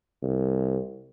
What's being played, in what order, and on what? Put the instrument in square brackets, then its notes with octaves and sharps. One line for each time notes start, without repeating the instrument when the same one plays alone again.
[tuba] C2